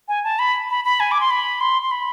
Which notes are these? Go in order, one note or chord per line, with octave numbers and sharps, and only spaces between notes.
G#5
A5
B5
B5
B5
G#5
D6
C6
B5
C6
C6
B5